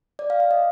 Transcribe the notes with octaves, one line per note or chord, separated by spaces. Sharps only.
D5
F5
F5
D#5